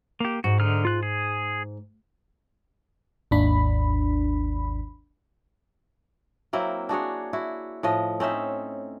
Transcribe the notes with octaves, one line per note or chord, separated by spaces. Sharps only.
A#3 G4
G#2 F#4
D3 D#4 F6
F4 F#6
G#4
G#1 D#2 D4 B5
F#3 A#3 C4 E4
D4 F#4 G#4 C#5
E4 F#4
A2 F3 D#5
C4 C#4 D#4 E5